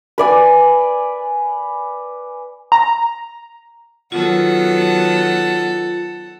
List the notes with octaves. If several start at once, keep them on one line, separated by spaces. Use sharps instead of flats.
B4 D5 G#5
A#5
D#3 F#3 B3 F4 A4 F#5